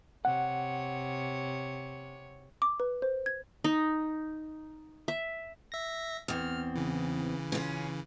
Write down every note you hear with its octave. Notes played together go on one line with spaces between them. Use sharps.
C3 C#5 F#5
D6
B4
C5
G#6
D#4
E5
E5 A#6
E2 C4 F6
C#3 E3
C#4 F4